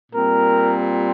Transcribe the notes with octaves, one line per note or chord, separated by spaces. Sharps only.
A#2 G3 C4 A#4